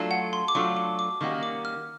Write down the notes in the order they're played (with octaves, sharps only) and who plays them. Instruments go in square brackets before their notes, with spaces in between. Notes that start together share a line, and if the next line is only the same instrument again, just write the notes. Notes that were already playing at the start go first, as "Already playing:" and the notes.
Already playing: [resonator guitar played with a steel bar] F#3 A3 D4 F4 A4
[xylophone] F#5
C6
D6
[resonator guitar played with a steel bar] F#3 A3 D4 F4 A4 [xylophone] C#6
[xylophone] D6
D6
[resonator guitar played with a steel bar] D#3 G3 A#3 C#4 F#4 [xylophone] C#6
[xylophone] D6
F6